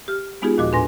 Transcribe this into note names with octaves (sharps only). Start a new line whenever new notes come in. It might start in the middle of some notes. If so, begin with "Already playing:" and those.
G4 F6
G#3 B3 D#4 F4 G4 G#4
D#2 A#2 F3 F#4 D#5 D6
A2 D4 B4 G#5 C6 A#6